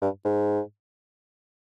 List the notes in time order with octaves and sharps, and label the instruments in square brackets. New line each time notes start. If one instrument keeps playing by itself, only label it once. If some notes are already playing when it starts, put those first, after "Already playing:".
[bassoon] G2
G#2